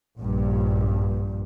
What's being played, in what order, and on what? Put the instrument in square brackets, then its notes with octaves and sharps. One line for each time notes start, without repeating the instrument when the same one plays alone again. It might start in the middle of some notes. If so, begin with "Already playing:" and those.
[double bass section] A#1 G2